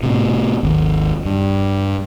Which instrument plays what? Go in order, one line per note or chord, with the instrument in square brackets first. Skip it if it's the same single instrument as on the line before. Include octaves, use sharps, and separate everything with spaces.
[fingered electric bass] A2 C3
G#1 D#2
G2